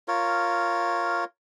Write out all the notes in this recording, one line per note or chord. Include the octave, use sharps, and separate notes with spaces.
F4 A#4 C#5